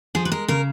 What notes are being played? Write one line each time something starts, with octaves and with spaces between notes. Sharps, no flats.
F3 G#4
B4
G#3 A#4
C#3 A#4